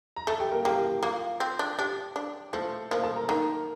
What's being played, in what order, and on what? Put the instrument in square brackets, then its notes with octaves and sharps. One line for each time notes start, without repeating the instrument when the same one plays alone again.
[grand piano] A#5
[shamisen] A3 [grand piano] A4 A5
[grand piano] G4 G5
A#3 A#4
[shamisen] A#3 [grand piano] G4
[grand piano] G4
G4
[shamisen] A#3 [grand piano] F4
[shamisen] C4
D4
[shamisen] D4 [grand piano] G4
[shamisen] D4
[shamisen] F3 [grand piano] A3 A4
[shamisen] F3 [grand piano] A#3 A#4
[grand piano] A4 A5
A#4 A#5
[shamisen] D#3 [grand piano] A#4 A#5